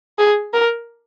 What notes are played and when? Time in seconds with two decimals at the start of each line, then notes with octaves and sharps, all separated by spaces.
0.18 G#4
0.53 A#4